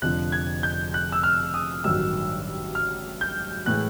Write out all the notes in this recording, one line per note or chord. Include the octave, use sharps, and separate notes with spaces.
F1 F2 D3 F3 F#6
G#6
G6
F#6
E6
F6
D#6
A1 G2 D#3 F#3 E6
F6
G6
A2 E3 G#3 F#6